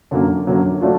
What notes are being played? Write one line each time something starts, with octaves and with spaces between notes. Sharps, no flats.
F#2 D3 F#3 A#3
F#2 D3 F#3 A#3
F#3 A3 D4 F4